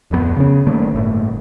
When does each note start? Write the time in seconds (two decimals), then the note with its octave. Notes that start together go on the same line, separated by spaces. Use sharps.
0.11 D1 F2 F#3 B3
0.37 C#3 C#4
0.67 D#3 G3 A3 A#3
0.93 G1 A2